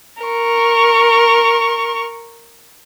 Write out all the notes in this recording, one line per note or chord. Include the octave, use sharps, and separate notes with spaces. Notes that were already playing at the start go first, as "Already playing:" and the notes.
A#4 C#6